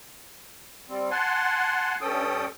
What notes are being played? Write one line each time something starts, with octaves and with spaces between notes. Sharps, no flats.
G3 C4
F#5 G#5 A5 C6
G2 C#4 A4 G5 D#6